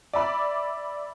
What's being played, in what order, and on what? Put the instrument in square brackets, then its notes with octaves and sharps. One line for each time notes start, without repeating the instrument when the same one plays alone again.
[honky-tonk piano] D5 E5 B5 D6